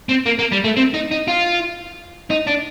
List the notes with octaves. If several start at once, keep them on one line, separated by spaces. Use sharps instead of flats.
C4
A#3
A#3
G3
A3
C4
D#4
D#4
F4
D#4
D4